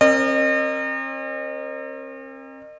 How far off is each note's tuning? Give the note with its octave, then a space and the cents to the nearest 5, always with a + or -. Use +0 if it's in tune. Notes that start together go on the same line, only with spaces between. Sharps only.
C4 +45 A#4 +0 D#5 -40